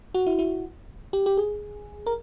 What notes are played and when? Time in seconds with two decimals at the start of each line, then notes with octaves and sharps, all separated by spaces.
0.14 F#4
0.26 E4
0.39 E4
1.13 G4
1.26 G4
1.37 G#4
2.07 A#4